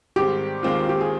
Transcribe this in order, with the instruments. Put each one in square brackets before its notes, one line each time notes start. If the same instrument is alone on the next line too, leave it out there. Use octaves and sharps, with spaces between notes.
[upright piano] G#2 D#3 G3 C4 [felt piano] G4
[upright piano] D#2 D#3 G#3 C4 F4
[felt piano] G4
G#4